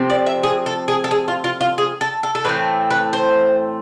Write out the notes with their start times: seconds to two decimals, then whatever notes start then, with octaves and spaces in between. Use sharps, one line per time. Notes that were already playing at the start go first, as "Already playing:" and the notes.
Already playing: C3 F3 A3 C4
0.10 D5
0.26 E5
0.43 G#4
0.66 A4
0.88 G#4
1.04 A4
1.11 G#4
1.28 F4
1.44 F4
1.61 F4
1.78 G#4
2.01 A4
2.23 A4
2.35 A4
2.44 A2 E3 A3 C4 B4
2.91 B4
3.13 C5